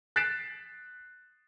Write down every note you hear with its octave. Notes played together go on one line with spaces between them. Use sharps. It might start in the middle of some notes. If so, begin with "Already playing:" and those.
F#6 A6 B6 C7 D7 E7